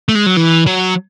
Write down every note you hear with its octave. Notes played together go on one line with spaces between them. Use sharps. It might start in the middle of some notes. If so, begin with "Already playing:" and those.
A3
G#3
F#3
E3
F#3